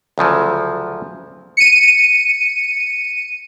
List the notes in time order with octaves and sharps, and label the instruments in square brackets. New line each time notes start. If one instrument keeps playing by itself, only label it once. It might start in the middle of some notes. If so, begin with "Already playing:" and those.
[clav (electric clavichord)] D2 C#3 F3 F#3
[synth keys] C#7 D#7